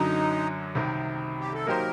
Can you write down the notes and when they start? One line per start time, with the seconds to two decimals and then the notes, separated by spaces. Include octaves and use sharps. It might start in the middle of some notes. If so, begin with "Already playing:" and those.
Already playing: F#2 D3 F#3 D#4
0.75 C2 C3 D#3
1.40 G4
1.53 A4
1.66 F#3 A#3 D#4 G4 A#4 C5